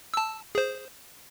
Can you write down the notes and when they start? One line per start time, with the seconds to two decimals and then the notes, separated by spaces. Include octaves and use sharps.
0.14 A5 E6
0.55 G#4 C5